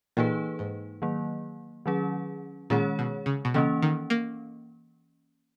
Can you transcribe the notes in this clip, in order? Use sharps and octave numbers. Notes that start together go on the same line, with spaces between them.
A#2 E3 A#3 D#4 G#4 B4
G#2
D#3 F#3 A#3
D#3 F#3 C#4 G#4
A#2 D#3 G#3 C#4 G#4 C#5
B2
C#3
B2
C#3 E3 A#3 C#4
D#3
A#3